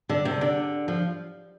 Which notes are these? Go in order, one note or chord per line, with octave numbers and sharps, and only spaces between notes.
D3
C3
D3
F3